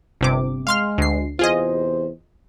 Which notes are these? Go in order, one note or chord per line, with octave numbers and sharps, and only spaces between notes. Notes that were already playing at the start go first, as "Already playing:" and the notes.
G1 C3 D6
G#3 F5 C6 F6
D2 C7
E2 C3 F4 G#4 C5 D#5